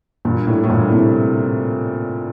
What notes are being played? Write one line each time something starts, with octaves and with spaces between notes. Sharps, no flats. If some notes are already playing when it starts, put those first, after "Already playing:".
G2 A#2
A2
A2
G2 A#2
A2 C3